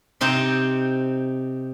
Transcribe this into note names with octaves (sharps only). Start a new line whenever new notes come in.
C3 C4 D#4 C6